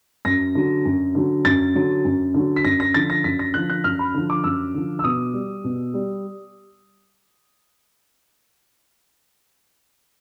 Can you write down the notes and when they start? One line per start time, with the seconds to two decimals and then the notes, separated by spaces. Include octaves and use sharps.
0.25 F#2 A#6
0.55 D3 F#3
0.85 F#2
1.15 D3 F#3
1.45 F#2 A6
1.75 D3 F#3
2.05 F#2
2.34 D3 F#3
2.56 B6
2.64 F#2 A#6
2.80 A#6
2.94 D3 F3 A6
3.10 A#6
3.24 F#2 B6
3.39 A#6
3.54 D3 F3 F#6
3.70 F#6
3.84 F#2 F6
3.99 B5
4.14 D3 F3
4.30 D6
4.44 F#2 E6
4.74 D3 F3
4.99 E6
5.04 B2 D#6
5.34 G3
5.64 B2
5.94 G3